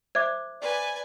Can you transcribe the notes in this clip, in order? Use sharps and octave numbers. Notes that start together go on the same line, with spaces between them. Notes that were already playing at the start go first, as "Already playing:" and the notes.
C5 E5 D6 G#6
B4 D5 G#5